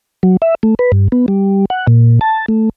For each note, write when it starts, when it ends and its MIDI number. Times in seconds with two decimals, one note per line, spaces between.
0.23 0.37 54
0.42 0.55 76
0.63 0.75 57
0.79 0.92 71
0.92 1.08 43
1.12 1.26 59
1.28 1.65 55
1.70 1.87 78
1.87 2.19 46
2.21 2.46 81
2.48 2.69 57